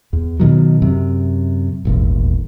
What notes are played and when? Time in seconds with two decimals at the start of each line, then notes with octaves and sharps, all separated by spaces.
0.13 E2
0.40 B2 D#3 F#3
0.82 F#2 C3
1.85 D#1 G#1 E2